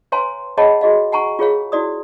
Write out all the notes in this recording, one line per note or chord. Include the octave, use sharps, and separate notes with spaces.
B4 C#5 F5 G#5 A#5 C6
G#4 C#5 D#5 F#5 A5 B5
F#4 G#4 D#5 F5
F#5 G#5 A#5 C#6
F4 G#4 C#5 F5
E4 F#4 D5 D#6